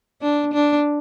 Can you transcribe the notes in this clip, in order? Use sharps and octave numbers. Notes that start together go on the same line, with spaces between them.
D4
D4